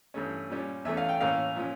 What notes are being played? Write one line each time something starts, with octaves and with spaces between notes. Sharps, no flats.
G2 E3 A3 C#4
A#2 G3 C#4
E2 E3 A3 C#4 E5
F5
G5
A2 E3 A#3 C#4 F5
A#2 F3 C#4